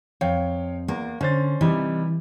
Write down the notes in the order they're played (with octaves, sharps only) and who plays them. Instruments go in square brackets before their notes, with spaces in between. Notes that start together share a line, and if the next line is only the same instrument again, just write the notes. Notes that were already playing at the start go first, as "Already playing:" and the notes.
[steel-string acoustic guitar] F2 [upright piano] C#5 F5 G5
[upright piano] E2 [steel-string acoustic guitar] A#3
[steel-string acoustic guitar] D3 [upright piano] C#4 C5 A6
[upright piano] C3 G3 D#4 [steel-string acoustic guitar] E3